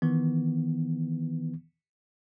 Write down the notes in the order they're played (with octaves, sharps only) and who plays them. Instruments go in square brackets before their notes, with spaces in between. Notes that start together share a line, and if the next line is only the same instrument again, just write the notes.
[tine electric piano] D#3 E3 B3